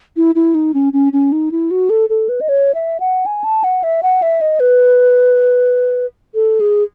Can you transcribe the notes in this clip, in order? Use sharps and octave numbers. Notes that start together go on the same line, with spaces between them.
E4
E4
D#4
C#4
C#4
C#4
D#4
E4
F#4
A4
A4
B4
D#5
C#5
E5
F#5
G#5
A5
F#5
E5
F#5
E5
D#5
B4
A4
G#4